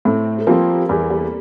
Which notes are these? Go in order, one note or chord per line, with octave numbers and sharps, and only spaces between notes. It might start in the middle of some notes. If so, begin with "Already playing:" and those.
A2 A3 C4
A3
F3 G3 A#3 C4
E2 G3
G3